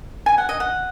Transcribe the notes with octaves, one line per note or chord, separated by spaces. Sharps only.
G#5
F#5
D#5
F#5